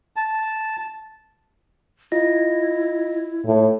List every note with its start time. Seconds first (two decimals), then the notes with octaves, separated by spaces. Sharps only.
0.16 A5
2.12 E4 F4 D#5 A#6
3.45 A2